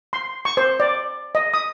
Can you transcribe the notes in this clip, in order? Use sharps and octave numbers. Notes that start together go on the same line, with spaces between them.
C6
C#6
C5
D5
D#5
D#6